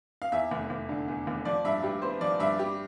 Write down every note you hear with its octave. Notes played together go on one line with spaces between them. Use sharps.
F5
E2 E5
F1
F1
D3
E2
F1
F3 D5
G2 E5
G2 G4
B3 C5
F3 D5
G2 E5
G3 G4